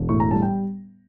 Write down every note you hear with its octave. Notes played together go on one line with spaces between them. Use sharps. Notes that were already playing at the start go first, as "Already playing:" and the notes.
Already playing: E1
A2 C#6
A#5
G3 A5
G5